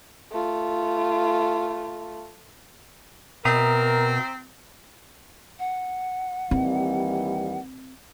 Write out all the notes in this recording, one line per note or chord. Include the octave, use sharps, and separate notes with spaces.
A3 F4
B2 C4 A#4 E5 A#5 D#6
F#5
D#2 E3 G3 C4